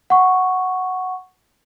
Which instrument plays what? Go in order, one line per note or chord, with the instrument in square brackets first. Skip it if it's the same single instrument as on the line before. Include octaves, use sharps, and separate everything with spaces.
[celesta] F#5 C#6